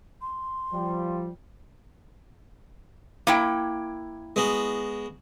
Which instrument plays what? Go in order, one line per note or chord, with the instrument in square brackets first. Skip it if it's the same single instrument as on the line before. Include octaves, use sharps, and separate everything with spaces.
[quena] C6
[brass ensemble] F3 G3
[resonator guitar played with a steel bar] A#3 E4 G5
[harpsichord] G#3 B3 F#4